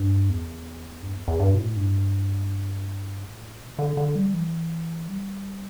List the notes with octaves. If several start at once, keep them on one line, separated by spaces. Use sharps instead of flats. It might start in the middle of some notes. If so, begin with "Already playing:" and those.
Already playing: G2
E2
G2
E2
E2
G2
B2
A2
G2
A2
B2
D3
D3
G3
E3
G3